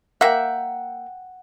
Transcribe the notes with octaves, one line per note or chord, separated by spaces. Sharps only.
A#3 E5 F#5 G5